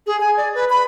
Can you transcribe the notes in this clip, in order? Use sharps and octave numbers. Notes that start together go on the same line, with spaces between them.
G#4
G#5
D5
B4
B5